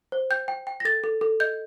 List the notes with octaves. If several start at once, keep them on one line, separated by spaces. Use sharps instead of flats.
C5
G5 G6
G5
G5
A#6
A4 A6
A4
A4
D#5 G6